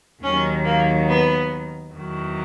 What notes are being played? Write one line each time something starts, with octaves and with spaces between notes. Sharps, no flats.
D#2 D#3 F#3 C#4
A#3
B3
E2 D#3 F#3